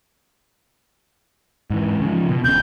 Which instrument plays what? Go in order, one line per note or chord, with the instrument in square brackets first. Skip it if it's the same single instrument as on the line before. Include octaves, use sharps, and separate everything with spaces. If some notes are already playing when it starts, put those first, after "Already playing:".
[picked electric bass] G#2 E3
C#3 F3
B2
[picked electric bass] E1 C#3 [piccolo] G6